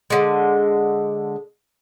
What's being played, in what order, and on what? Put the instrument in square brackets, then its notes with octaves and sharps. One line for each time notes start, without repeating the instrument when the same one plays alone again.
[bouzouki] D3 G#3